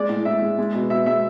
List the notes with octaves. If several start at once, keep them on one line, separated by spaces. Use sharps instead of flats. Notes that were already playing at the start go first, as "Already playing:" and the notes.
Already playing: G#3 D5
A2
A2 E5
G#3
G#3
B2
B2 E5
G#3 E5